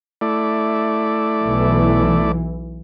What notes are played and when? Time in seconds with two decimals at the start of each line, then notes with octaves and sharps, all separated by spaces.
0.21 A3 E4 D5
1.45 B1 E3